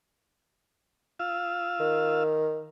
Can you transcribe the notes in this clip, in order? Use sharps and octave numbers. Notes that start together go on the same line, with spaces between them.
F4 F5 E6
D#3